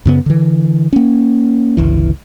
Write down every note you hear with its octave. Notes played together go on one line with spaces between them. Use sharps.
F#2 C#3 B3
D3 E3
A#3 C#4
G1 C#2 E3